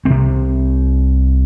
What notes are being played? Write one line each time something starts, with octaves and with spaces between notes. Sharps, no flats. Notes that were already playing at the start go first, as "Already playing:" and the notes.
C2 C3 C4